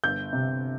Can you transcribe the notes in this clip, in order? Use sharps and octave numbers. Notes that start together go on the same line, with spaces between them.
G1 G6
C3